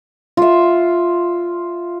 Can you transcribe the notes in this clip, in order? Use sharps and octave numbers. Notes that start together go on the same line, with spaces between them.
F4 E5